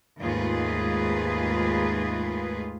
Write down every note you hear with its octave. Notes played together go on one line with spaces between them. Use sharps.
D#2 G#2 A3 F4 G#4 B4